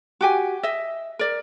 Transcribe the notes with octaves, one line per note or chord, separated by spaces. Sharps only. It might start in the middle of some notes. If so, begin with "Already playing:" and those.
F#4 G4 G#5
D#5 E5
A#4 D5